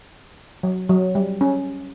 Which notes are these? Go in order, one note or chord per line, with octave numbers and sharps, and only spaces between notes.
F#3
F#3
G3
C#4